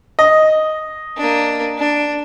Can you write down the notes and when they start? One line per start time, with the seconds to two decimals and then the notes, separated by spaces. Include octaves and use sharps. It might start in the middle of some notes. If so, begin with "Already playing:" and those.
0.19 D#5
1.17 A#3 D4
1.78 D4